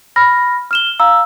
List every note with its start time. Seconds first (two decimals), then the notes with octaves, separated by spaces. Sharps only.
0.16 B5 F6 A#6
0.71 F6 E7 G7
1.00 F5 A#5 E6